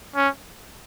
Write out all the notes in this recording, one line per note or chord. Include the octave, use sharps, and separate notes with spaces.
C#4